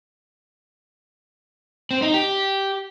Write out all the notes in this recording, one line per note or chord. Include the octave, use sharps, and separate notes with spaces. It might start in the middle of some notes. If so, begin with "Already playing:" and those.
C4
D#4
G4